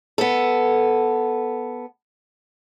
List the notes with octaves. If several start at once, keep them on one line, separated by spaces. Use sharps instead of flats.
B3 A4